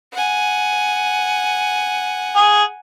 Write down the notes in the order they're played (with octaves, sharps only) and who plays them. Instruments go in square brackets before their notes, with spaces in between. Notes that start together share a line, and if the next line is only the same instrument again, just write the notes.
[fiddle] F#5 G#5
[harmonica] G#4